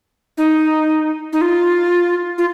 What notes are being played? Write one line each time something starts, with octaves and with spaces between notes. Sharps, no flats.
D#4
D#4
F4
F4